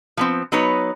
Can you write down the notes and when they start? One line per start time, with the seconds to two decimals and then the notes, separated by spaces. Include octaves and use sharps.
0.17 F3 B3 C4
0.52 F#3 B3 D#4 B4 C#5